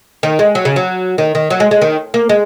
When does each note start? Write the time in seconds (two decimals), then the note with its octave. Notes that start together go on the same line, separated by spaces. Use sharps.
0.23 D#3
0.39 G#3
0.55 F#3
0.65 C#3
0.76 F#3
1.18 D#3
1.35 D#3
1.50 F#3
1.60 G#3
1.71 G#3
1.81 D#3
2.14 A#3
2.29 G#3